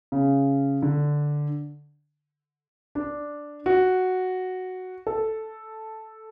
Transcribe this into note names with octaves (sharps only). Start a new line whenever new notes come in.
C#3
D3
D4
F#4
A4